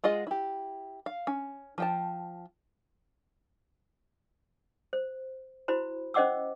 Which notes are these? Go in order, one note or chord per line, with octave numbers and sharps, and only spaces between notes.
G#3 F4 G#4 D#5 F#5
E4 G4
F5
C#4
F3 G5 A5
C5
E4 F#4 C5 B5
C#4 C5 D#5 F#5 D6 E6